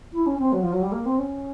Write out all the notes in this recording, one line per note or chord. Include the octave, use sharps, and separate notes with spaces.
E4
C#4
C4
F#3
F3
F#3
G3
A#3
C4
C#4